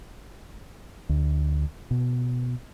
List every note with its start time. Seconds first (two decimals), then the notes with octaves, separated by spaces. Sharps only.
1.09 D2
1.91 B2